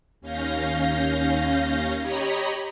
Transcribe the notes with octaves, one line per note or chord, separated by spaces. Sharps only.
D#2 C#4 F5 G6 A#6
G4 C#5 D#5 A#5 B5